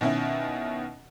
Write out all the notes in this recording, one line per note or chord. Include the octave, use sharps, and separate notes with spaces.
B2 D#3 C#4 E4